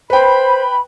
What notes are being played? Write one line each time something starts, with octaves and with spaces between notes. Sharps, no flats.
B4 C5 G5 B5